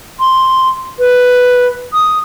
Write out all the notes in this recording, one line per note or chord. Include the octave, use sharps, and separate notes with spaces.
C6
B4
D#6